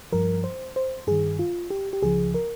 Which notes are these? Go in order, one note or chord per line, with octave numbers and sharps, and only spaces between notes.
G2 F3 A#4
C5
C5
G2 D#3 G#4
F4
G4
G4
C#2 C#3 F3 G#4
A#4